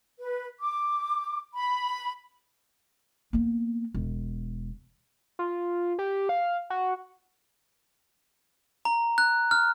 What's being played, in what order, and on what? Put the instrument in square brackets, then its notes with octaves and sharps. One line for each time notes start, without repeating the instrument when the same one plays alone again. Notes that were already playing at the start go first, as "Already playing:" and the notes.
[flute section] B4
D6
B5
[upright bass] A#3 B3
E1
[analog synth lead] F4
G4
F5
F#4
[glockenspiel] A#5
F#6
F6